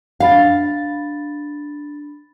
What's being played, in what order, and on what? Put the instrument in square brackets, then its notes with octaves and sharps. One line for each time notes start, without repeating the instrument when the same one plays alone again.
[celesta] D4 B5 A6 [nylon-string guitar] F5